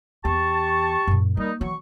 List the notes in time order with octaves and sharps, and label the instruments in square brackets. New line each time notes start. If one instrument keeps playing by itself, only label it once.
[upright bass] E2 [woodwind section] G4 A5 C#6
[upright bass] F#2 A#2
[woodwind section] D#3 G3 D#4 [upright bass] A#3
[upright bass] E3 [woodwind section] F#3 C#6